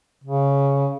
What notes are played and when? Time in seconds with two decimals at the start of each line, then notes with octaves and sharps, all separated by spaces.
0.24 C#3